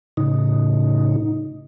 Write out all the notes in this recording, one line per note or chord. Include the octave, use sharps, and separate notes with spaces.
A2 C#3 D#4